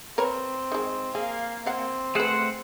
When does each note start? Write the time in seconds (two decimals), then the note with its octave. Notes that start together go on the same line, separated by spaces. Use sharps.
0.18 C4 A#4 B4 C#5
0.72 D#3 G#3
1.15 A#3 G#4 F5
1.66 C4 F5 F#5
2.15 A3 G#4 B4 C5 F#5